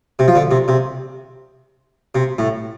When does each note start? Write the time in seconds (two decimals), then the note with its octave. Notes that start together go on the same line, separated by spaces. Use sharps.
0.19 C3
0.28 F3
0.35 D3
0.51 C3
0.68 C3
2.15 C3
2.38 A2